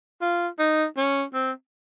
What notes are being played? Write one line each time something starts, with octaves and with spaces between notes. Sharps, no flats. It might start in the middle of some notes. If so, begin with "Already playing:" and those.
F4
D#4
C#4
C4